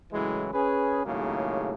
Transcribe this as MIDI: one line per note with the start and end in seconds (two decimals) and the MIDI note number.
0.13 0.48 45
0.13 0.48 49
0.13 0.48 52
0.13 0.48 54
0.13 0.48 56
0.53 1.03 61
0.53 1.03 68
0.53 1.03 71
1.04 1.74 39
1.04 1.74 45
1.04 1.74 49
1.04 1.74 54
1.04 1.74 56
1.04 1.74 58